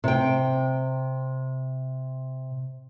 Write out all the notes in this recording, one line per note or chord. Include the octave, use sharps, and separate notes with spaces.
C3 G5